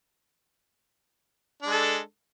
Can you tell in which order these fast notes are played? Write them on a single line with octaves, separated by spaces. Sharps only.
D4 G#3 A4